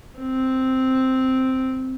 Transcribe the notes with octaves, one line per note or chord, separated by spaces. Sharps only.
C4